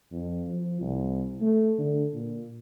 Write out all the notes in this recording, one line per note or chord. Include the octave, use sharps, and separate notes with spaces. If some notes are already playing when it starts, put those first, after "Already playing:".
F2
F3
C2
A3
D3
A#2